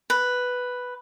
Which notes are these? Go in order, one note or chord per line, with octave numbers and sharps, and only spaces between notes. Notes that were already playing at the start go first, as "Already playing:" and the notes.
B4